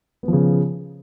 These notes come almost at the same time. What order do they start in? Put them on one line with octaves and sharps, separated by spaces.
B3 F3 C#3